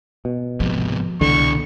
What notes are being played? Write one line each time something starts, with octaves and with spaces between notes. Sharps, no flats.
B2
G#2 C3 F3
C2 B2 D3 E3 C#6